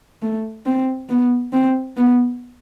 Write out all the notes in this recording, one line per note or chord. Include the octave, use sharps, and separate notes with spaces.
A3
C4
B3
C4
B3